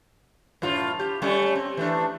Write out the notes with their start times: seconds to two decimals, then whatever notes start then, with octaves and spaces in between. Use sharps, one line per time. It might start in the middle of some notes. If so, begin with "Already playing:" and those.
0.62 F#2 A2 F4
0.99 G4
1.22 G3 A3 C#4
1.56 C4
1.77 E3 A3 D4